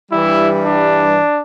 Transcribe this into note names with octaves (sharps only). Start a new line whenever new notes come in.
G2 E3 G3 E4
D4